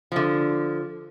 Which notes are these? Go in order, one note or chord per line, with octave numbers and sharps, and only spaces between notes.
D3 F3